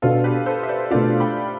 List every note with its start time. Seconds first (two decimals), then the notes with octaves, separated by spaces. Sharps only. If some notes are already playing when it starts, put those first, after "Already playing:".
0.02 B2 B3 D4 F4 A4
0.24 G4 B4
0.46 A4 C5
0.63 E5
0.69 B4 D5
0.91 B2 A3 D4 F4 D5 F5
1.20 G5 B5